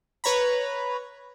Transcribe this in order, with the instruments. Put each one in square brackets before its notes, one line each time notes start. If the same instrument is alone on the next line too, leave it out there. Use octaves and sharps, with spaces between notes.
[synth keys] B4 C#5 A#5 B5